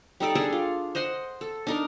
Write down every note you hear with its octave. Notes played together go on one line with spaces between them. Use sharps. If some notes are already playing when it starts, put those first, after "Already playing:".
G3 D#4 A4 D5
G3 D4 G#4 A4
F4
C5 D#5 F#5 C6
A4
D4 D#4 A#4